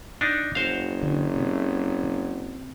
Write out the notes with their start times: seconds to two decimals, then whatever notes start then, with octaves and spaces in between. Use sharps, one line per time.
0.21 D4 D#4
0.55 F#1 F#4 C5 F5
1.03 D3
1.36 C3